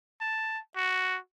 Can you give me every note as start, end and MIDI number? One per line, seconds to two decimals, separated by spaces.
0.21 0.59 81
0.76 1.18 66